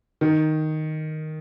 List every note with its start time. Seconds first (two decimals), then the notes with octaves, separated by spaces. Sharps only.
0.21 D#3